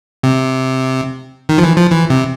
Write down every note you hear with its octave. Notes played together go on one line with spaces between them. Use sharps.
C3
D#3
F3
E3
F3
E3
C3